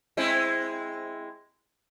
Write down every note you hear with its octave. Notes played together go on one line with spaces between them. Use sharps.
G#3 C4 E4